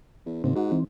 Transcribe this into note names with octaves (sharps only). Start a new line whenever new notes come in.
E2
D#2 A2 C#3 C4
G#2 F#4
E3 C4